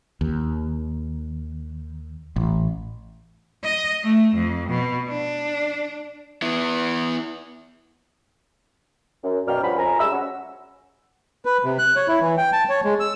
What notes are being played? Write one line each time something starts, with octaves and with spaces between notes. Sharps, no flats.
D#2
A1
D#5
A3
F2
B2
D4
B3 E4
F#2
F#2 B2 A#4 D5 G5 F6
G2 F3 C#4 F#4 B5
F2 F3 G#5 A#5
F#2 G3 G#3 B5 E6
C#4 F#4
B4
C3
F#6
C#5
E4
E3
G5
A5
C#5
G#3
E6